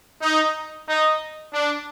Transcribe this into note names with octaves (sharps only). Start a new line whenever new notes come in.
D#4
D#4
D4